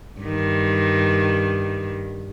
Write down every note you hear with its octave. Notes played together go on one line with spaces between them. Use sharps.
G2 D#3